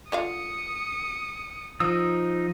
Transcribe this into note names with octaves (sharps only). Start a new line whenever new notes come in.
D3 F4 F5 D#6 C#7
F3 D#4 D#6 E6